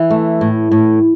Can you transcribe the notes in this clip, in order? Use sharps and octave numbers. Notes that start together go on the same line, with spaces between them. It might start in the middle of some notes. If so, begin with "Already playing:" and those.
Already playing: E3
A3
A2
A2